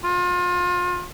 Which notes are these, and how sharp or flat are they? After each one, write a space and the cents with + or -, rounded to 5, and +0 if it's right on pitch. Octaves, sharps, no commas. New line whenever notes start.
F4 +30